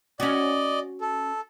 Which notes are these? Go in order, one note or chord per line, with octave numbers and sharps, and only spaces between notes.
C#4 F#4 D5 D#5
A4